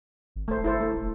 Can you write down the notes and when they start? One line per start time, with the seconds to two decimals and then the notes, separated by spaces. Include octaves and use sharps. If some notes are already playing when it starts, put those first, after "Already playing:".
0.36 G#1
0.48 D1 A3 C5
0.64 G1 E4 A4 C5
0.80 A3
0.96 D#1